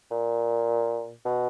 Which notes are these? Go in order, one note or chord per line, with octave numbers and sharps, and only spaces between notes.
A#2
B2